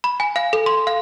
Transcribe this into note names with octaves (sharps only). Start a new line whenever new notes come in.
B5
G#5
F5
A4
C6
F5